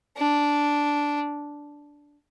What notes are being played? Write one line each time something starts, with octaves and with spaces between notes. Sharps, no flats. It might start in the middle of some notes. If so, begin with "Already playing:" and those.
D4